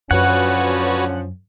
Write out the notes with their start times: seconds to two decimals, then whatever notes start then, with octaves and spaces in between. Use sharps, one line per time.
0.11 F#2 D3 F3 C#4 F#4 B4 C#5 F#5